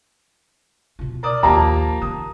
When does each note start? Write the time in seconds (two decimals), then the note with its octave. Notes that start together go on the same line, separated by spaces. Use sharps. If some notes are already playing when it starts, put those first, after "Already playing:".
0.99 B2 F4
1.23 A#4 D5 D#6
1.43 A#1 D#2 F3 A#3 G4 A5 A#5
2.02 D#3 D#4 D#6